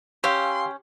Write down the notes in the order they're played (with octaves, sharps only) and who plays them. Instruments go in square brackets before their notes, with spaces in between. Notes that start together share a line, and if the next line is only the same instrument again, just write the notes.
[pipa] C#4 [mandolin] G4 [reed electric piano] F5 G#5 E6 [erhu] C6